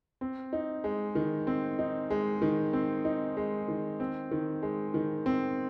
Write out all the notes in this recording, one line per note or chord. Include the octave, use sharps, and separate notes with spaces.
C4
D#4
G#3
D#3
C4
D#4
G#3
D#3
C4
D#4
G#3
D#3
C4
D#3
G#3
D#3
C4